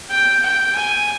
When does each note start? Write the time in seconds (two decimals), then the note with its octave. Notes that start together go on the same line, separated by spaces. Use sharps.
0.10 G5
0.43 G5
0.76 G#5